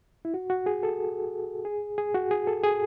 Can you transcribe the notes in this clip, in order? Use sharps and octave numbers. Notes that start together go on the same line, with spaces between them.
E4
F#4
F#4
G#4
A4
G#4
G#4
F#4
G#4
A4
G#4